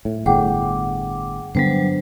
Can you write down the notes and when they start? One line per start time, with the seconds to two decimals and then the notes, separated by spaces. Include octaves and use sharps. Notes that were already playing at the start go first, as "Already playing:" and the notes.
0.05 A2
0.26 G1 A2 G#4 F#5 G5 D6
1.55 G2 D3 F#3 G3 B3 C5